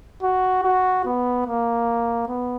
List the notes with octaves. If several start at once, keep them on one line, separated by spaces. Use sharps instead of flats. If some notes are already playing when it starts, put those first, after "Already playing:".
F#4
F#4
B3
A#3
B3